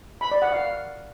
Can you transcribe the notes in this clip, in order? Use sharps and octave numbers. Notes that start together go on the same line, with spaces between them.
B5
D5
F#5
F5